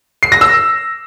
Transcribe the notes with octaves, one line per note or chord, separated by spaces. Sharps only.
C7
A#6
E6